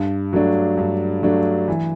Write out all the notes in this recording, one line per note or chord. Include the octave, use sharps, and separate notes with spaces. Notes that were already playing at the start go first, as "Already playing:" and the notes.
Already playing: G2
F#3 A3 D4
G2
F#3 A3 D4
E3